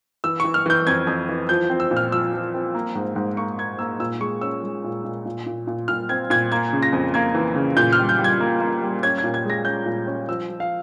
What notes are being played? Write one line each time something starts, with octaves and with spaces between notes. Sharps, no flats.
E3 E6
E3 C#6
F6
E3 G6
F2 G#6
F2
E3
F3 G6
C4
E6
A#2
F6
F3 E6
F3
C4
A#3
G#2
G#2
A#3 C#6
A#3 G#6
A#3 E6
A#2 E6
G#3 C#6
C#4 E6
G#3
A#2
A#2
A#2
A#2
A#2
A#2 F6
C4 G#6
A#2 G#6
A#3 G#6
C#3
A#6
F2
A#3 G#6
E3
C#3
A#2 G6
F6
G3
G6
G3
G#6
A#3
A#3
G3
C#4 G#6
G#6
A#2
G#6
G#3 A#6
C#4 G6
A#2
C#4
F3 E6
F3
F5